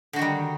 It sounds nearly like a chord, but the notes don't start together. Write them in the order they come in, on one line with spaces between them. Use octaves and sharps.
D3 F#4 D#3 G3